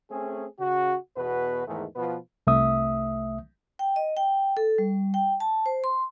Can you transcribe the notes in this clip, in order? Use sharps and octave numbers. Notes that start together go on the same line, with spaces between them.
A3 C4 C#4 G#4
C#3 F#4
E2 B2 F#4 B4
E2 G#2 D#3 E3 G#3 A3
B2 F3 B3 F4 B4
C2 A3 E5 D#6
G5
D#5
G5
A4
G3
G5
A5
C5
C6